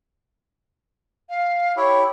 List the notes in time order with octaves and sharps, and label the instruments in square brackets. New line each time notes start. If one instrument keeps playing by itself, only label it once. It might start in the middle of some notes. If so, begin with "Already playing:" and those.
[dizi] F5
[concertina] E4 G4 [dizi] C#5